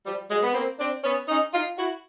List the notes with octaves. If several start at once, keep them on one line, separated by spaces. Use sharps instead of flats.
F3 G3
F#3 G#3
B3
A#3 C4
C4 D4
B3 C#4
C#4 D#4
D#4 F4
E4 F#4